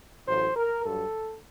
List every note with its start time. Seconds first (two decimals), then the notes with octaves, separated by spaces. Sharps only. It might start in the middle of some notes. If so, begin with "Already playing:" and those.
0.27 A1 A2 F#3 C5
0.56 A#4
0.84 G2 F#3 A4